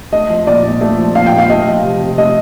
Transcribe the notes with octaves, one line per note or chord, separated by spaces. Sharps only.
A3 D#5
F3
A#2 D5
A#2
A3
F3
A#2 F5
G5
A#2
F5
A3 D#5
F3
C3
C3
A3 D#5